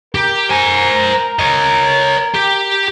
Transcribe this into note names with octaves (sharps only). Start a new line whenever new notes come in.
G4 A#4
C5 G#5
C#5 D#5
G4